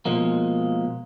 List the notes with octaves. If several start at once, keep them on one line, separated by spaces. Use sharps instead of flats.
B2 F3 G#3 A#3